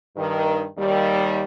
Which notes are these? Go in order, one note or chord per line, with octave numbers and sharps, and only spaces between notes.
G2 D#3
D#2 G3